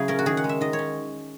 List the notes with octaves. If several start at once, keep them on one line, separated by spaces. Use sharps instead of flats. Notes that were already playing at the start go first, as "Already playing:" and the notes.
Already playing: C#3 F#3 E4 G#4
C#4 A#4
F#4
D#3 G#4
F#5
G#3
E5
D#3 D#5
C#5
C#4